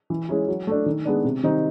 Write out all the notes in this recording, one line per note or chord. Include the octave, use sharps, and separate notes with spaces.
E3
G#3 C#4 E4
F#3
A3 D4
D#3
G#3 B3 D4
C3
D#3 G3 C4 D#4